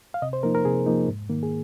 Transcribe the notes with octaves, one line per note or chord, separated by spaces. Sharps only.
F5
C3 D#5
C5
F3 A#3 D#4 A#4
A#4
C3 G#4
F3 A#3 D#4
G#2
D#3 A#3
G#4